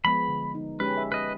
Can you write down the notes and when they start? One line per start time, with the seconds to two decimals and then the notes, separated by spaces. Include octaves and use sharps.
0.05 F3 G#3 B3 B5
0.28 D3
0.55 D#4
0.80 G#3 C#4 G4 B4
0.97 E5
1.12 B4 D#5